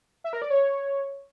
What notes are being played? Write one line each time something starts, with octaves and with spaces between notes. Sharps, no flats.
E5
A#4
D5
C#5